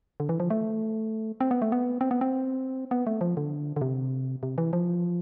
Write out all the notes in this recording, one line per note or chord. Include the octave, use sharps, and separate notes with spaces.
D3
E3
F3
A3
C4
B3
A3
B3
C4
B3
C4
B3
A3
F3
D3
D3
C3
C3
E3
F3